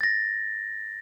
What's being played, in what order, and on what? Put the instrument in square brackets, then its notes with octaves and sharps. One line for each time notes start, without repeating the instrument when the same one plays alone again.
[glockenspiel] A6 A#6